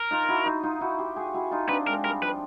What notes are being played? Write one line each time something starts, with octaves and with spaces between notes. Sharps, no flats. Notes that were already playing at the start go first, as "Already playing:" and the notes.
Already playing: A#4
D#4 F4
E4 F#4
D#4 F4
D#4 F4
E4 F#4
F4 G4
F#4 G#4
E4 F#4
D#4 F4
C4 D4 B4
G#3 A#4
G3 A#4
F3 B4